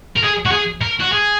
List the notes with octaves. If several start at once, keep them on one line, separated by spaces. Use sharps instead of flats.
A#4
G#4
F#4
G#4
A#4
F#4
G#4